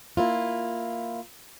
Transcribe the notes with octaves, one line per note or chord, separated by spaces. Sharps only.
A#3 E4 F4